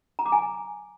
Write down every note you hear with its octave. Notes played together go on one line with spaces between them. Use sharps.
A#5
D6
G#5